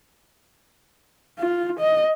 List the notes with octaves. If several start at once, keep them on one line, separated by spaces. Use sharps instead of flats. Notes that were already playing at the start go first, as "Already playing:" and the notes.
F4
D#5